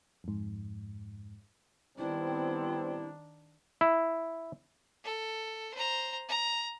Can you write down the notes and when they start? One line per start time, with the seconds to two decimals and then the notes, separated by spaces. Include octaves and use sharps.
0.24 F2 G#2
1.98 D#3 G3 B3 C4 D4 E4
3.81 E4
5.04 A4
5.74 C5 A#5
6.29 A#5